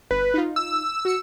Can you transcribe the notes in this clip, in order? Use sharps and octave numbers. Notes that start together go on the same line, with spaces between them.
G1 B4
D#4 F4
E6
F#4 C#7